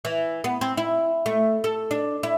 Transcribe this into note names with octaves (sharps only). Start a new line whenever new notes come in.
E3
B3
C4
E4
A3
A4
D4
E4